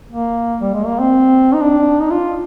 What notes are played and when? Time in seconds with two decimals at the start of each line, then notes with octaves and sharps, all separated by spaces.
0.11 A#3
0.61 G3
0.74 G#3
0.86 A#3
0.99 C4
1.54 D#4
1.61 D4
2.01 D#4
2.11 F4